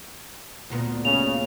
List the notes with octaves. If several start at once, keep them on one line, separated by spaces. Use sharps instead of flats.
D2 A#2 B3
C#3 F7